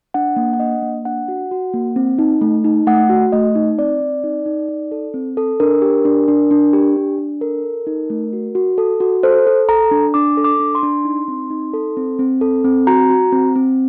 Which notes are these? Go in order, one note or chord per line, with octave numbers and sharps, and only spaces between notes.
D4 F#5
A#3
F#5
D4 D#5
A#3
D4 F#5
F#4
F#4
A#3
C4
D#4
A3
D#4
A3 F#5
F#4
A3 D#5
D#4
C4 D5
C4
D#4
D#4
D#4
A4
C4
A4
D4 A#4
G4
D4
D4
D4
G4
D4
D4
A4 A#4
A4
D#4
A3
F#4
F#4
A4
F#4
A4 C5
A4
A4 A#5
D4
D4 D6
A4
D6
D4
C6
D4
D#4
C4
D#4
A4
C4
C4
A4
C4
F#4 A#5
F#4
C4
C4